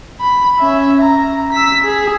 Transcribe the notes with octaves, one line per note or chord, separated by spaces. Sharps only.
B5
C#4 E5
A#5
E6 B6
G#4